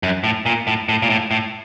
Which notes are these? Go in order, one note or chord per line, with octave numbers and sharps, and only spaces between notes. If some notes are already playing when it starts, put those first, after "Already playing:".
F#2
A2
A#2
A2
A2
A#2
A2
A2